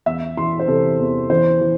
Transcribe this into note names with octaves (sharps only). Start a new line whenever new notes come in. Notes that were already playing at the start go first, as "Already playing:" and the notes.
E2 E5
E3 C6
C5
C3 A4
E2
E3 C5
E3